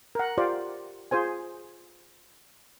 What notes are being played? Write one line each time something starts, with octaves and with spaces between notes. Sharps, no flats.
A#4 F#5
F4 G4 C5 D5 F5
F4 G#4 C5 G#5